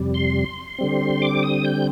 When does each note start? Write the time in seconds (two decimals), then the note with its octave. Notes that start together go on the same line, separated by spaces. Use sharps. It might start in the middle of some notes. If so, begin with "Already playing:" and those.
Already playing: F2 C3 G3
0.14 C6
0.79 D3 G3 C4
1.22 D6
1.43 D#6
1.65 G6